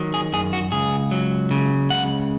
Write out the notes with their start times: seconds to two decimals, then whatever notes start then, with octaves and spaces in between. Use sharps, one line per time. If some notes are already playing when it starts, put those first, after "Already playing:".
Already playing: D#3 F#3
0.14 G#4
0.33 F#2 G#4
0.53 F#4
0.72 C#2 G#4
1.11 F#3
1.51 C#3
1.90 C#2 F#5